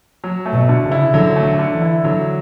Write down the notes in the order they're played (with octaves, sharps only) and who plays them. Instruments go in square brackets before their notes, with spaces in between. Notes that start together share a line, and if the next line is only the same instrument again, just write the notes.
[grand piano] F#3
A3
[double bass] B2
[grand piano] D3
[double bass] C#3
[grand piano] E4
[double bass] D3 [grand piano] F#3
[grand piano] A3
[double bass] D3
[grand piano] D3
[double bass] E3
[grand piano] E4
[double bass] D3 [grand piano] F#3